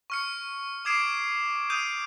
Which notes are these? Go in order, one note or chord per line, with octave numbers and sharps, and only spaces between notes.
C#6 F6 C#7
D6 D#6 G#6 C7 D7 E7
D#6 G6 D#7